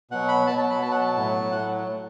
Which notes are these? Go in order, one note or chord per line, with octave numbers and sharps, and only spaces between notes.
B2 F#3 F#5
B5
B2 F#3 A5
A5
B5
B2 F#3 A5
F#5
A5
A2 F#3
A2 F#3 F#5